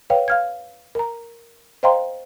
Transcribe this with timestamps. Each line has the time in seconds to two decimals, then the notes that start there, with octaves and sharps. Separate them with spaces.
0.10 B4 C#5 F5 G5
0.28 F5 F6 G#6
0.95 A#4 A#5
1.83 C5 D#5 F5 G5 A#5 C6